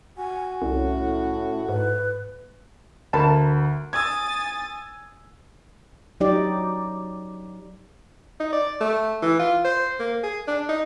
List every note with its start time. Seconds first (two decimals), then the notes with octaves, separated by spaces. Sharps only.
0.18 F#4 G#5
0.62 C2 A2 C#4
1.69 G#2 B4
3.13 D2 A#4 A5 B5
3.93 G#5 D#6 E6 G#6 A6
6.20 F#3 D#4 G4 D5
8.40 D#4
8.53 D5
8.81 A3
9.22 E3
9.40 F4
9.65 C5
10.00 A#3
10.23 G#4
10.48 D4
10.69 D#4